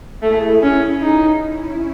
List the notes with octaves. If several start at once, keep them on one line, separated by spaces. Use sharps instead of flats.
A3 E4 G#4
C#4
D#4
C#4 E4